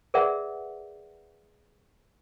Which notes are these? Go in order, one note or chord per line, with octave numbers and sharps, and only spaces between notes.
G#4 A#4 B4 D5 E5 F#5